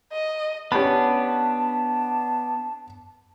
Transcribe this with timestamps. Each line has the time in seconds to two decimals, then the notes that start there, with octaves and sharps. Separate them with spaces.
0.12 D#5
0.72 B3 C#4 D4 G4 A5 B5